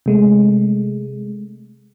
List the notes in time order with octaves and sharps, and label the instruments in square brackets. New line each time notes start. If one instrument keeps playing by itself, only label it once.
[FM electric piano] C3 G#3 A3